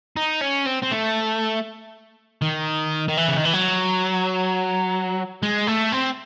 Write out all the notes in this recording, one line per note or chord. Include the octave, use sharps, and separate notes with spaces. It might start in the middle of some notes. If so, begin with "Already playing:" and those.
D#4
C#4
C4
C4
A3
D#3
D#3
E3
C#3
D#3
E3
F#3
G#3
A3
C4